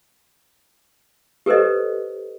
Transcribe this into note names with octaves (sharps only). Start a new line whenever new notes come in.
G4 A4 B4 C5 D#5